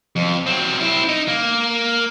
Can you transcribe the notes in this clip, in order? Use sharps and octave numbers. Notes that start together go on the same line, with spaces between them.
F2
F#3 C4
C4 E4
D#4
A#3